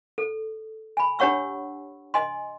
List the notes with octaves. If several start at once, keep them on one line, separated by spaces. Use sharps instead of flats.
A4
G#5 B5
D4 G4 C#5 F#5 C#6 E6
D#5 G#5 C6